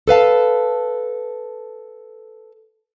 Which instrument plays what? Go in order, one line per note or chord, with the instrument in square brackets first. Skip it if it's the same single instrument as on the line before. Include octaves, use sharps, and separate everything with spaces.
[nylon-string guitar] A4 B4 F5 A5